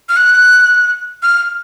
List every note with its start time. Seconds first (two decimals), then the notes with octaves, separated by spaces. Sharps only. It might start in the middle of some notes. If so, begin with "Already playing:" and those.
0.09 F6
0.16 F#6
1.23 F6